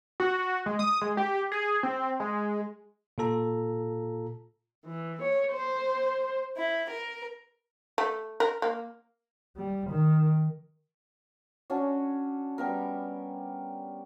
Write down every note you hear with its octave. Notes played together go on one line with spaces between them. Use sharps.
F#4
G#3
D#6
G#3
G4
G#4
C4
G#3
A#2 F4 A4 A#5
E3
C#5
C5
E4
A#4
A3
A#4
A#3
G3
D#3
C#4 D4 F#4
G3 B3 A#4